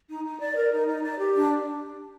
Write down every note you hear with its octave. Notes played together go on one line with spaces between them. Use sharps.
D#4
D#4
D5
A#4
D#4
D#4
D5
G4
D4